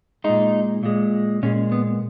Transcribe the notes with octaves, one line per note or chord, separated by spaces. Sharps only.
A#2 G#3 D#4
A#2 G#3
A#2 G#3 C#4
B3